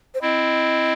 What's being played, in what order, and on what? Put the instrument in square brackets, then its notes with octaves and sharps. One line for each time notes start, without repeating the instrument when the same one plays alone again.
[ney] C5
[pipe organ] C4 E4 [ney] D#5